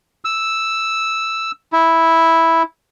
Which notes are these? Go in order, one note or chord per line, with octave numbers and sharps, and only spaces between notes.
E6
E4